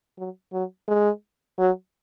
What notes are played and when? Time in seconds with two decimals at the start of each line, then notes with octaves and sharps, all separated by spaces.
0.18 F#3
0.53 F#3
0.88 G#3
1.59 F#3